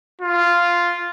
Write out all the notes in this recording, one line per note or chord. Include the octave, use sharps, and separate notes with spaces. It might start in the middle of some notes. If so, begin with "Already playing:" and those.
F4